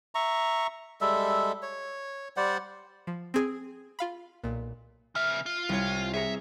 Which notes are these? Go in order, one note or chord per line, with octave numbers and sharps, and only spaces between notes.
E5 A#5 C#6
G3 G#3 A4 E5
C#5
G3 C5 D5 F#5
F3
C4 G#4
F4 F5 B5
B1 A#2
C#3 E5 F6
F4
C2 C#5
G#4 C#5 E5 A#5